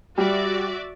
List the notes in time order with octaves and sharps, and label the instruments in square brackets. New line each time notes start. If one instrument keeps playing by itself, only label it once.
[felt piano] G3 [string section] F#4 D5 E5